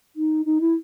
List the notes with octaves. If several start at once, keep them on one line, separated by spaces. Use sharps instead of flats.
D#4
D#4
E4